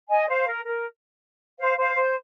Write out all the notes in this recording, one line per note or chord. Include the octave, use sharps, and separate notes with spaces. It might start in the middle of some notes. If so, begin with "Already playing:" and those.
D#5 G#5
C5 F5
A#4
A#4
C5 F5
C5 F5
C5